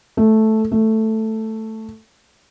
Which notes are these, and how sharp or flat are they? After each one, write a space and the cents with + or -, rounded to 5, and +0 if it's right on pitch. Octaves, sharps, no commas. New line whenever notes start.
A3 -5
A3 +5